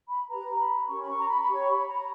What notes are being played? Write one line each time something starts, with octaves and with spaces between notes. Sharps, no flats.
B5
G4 B4 A#5
B5
C#4 G4 A#4 C#5 C#6
B5
C#6
A#5
B5
B5
G4 C#5 C#6
B5
A#5